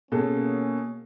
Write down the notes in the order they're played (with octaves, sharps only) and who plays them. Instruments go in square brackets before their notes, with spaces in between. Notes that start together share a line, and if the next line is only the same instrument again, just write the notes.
[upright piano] B2 A4 [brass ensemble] A#3 C#4 [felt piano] G#4